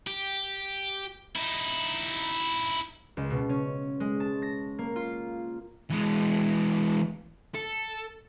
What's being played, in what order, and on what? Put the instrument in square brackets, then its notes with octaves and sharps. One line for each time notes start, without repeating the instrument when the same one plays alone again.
[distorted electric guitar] G4
D#4 E4
[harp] C#2
B2
C#4
G#3
A5
A#6
A#3
F4
[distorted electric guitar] E3 G#3
A4